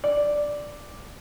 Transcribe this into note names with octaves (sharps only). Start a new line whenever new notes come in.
D5